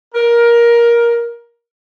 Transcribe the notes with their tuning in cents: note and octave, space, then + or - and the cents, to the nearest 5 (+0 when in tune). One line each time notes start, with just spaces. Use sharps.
A#4 +15